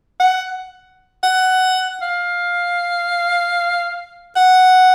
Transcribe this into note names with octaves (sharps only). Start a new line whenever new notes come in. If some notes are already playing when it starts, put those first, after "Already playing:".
F#5
F#5
F5
F#5